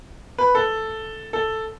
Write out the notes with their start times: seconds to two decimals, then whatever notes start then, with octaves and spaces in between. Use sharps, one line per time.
0.38 B4
0.55 A4
1.33 A4